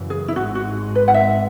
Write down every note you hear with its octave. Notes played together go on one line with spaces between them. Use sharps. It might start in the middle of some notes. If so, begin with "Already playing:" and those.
Already playing: F#2 C#3 E3
G#4
E4
G#1 G#2 G#3 F#4
F#4
B4
F#5
E5